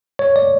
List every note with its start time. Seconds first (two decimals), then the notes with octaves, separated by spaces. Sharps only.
0.19 C#5
0.36 D5